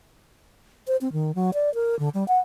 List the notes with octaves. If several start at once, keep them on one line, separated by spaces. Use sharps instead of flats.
C5
C4
D#3
F#3
D5
A#4
D3
G3
F#5